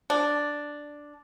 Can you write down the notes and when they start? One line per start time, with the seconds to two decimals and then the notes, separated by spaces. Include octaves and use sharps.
0.10 D4